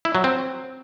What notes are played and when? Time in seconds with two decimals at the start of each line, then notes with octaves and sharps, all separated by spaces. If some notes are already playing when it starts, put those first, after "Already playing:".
0.05 E4
0.15 F#3
0.24 C4